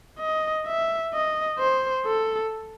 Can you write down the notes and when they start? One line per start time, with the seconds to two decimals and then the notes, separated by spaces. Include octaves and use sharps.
0.19 D#5
0.66 E5
1.13 D#5
1.59 C5
2.06 A4